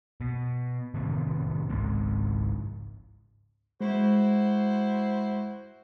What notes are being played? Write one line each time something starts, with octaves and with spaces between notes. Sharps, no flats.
B2
A2 C3 D#3 B3
G#1 C#2 G#2
G#3 E4 F#4 C5